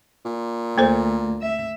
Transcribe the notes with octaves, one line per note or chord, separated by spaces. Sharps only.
A#2
D2 A#3 A4 C5
E5